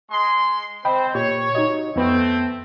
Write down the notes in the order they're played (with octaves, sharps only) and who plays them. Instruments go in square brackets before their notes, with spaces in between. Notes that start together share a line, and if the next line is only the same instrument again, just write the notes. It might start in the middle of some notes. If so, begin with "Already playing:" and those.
[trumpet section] G#3 C6
[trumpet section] C4 C5 [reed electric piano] D#5 G5 B5
[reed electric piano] A#2 G4 [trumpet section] C#5
[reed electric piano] D#4 F#4 D#5
[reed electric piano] F2 B3 [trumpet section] A3 C4